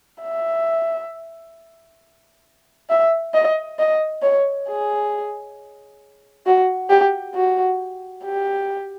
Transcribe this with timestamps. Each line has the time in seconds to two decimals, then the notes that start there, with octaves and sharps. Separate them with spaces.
0.22 E5
2.90 E5
3.34 D#5
3.79 D#5
4.22 C#5
4.68 G#4
6.46 F#4
6.89 G4
7.35 F#4
8.24 G4